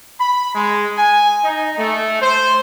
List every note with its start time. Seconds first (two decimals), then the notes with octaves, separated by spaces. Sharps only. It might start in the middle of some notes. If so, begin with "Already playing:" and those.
0.21 B5
0.55 G#3
0.98 G#5
1.45 D#4
1.79 A3
2.22 C5